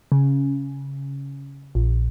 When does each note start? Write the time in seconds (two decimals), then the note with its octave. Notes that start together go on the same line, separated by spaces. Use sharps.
0.12 C#3
1.75 A#1